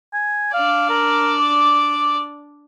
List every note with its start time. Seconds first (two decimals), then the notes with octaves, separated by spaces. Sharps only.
0.13 G#5
0.54 D4 D5 F5
0.90 A#4
1.39 D6